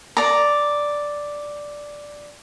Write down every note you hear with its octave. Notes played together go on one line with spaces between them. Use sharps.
D5 A#5